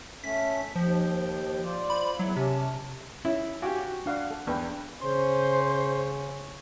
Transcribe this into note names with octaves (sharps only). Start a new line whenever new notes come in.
A3 C#4 B6
D#2 F3 G5
F4 C5 D5
B5
E2 F#3 E4 F#5
C3 C#4 A5
C#4 E4
F#4 G4 F5 G#5 D6
D4 F5 F#5
A4
E2 D4 B4 G5
C#3 C#4 C5 C6